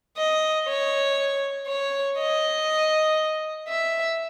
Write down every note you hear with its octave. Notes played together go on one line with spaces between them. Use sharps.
D#5
C#5
C#5
D#5
E5